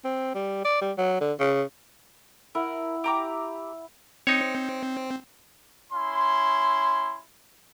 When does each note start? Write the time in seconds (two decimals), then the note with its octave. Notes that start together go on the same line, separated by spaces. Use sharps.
0.04 C4
0.35 G3
0.65 D5
0.81 G3
0.98 F#3
1.21 D3
1.40 C#3
2.55 E4 A#4 F#5
3.04 G4 A#5 D6
4.27 C4 D#4 C#5
5.92 C#4 E4 C6